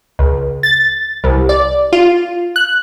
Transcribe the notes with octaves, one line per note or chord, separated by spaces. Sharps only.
C#2
A6
C2
D5
F4
F#6